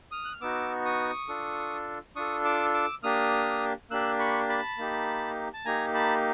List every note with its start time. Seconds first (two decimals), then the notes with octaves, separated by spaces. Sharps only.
0.12 D#6 F6
0.25 F#6
0.33 F6
0.41 B3 D#4 F#4 D6 E6
0.85 C#6 D#6
1.28 D4 F4 A4
2.16 D4 F4 A4 C#6 D#6
2.45 D6 E6
2.74 D6 E6
3.03 A#3 D4 G4 D#6 F6
3.90 A#3 D4 G4 E6 F#6
4.19 B5 C#6
4.49 A5 B5
4.78 A#3 D#4 G4
5.54 A5
5.65 A#3 D#4 G4 G#5 A#5
5.94 A5 B5